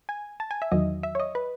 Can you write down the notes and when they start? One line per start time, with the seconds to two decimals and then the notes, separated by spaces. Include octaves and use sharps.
0.09 G#5
0.40 A5
0.51 G#5
0.62 E5
0.72 E2 D#3 F#3 D#5
1.03 E5
1.15 C#5
1.20 D#5
1.35 B4